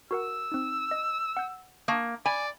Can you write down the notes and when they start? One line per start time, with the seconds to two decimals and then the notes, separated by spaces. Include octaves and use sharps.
0.11 F#4 A#4 F#5 E6
0.52 C4 D#4
0.91 D#5
1.37 F#5 G6
1.88 A#3 A5 C#6 D#6
2.26 D5 G#5 B5